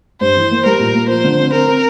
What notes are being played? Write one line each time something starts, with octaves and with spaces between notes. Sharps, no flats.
G2 C5
E3
A#3
G3 A#4
A#2
A#3
F3 C5
D3
C4
C4 A#4
C4